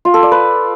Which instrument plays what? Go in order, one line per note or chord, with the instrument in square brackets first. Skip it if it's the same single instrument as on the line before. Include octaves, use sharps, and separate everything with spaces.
[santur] F4
A4
D5
B4